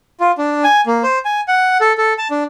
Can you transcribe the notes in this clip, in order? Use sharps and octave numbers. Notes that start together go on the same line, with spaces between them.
F4
D4
G#5
A#3
C5
G#5
F#5
A4
A4
A5
D4